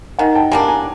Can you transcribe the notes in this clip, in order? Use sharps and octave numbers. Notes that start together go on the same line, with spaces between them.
D#3 F#5 G#5
G5 A5
G3 A#3 D4 G#5 A#5
G#5 A#5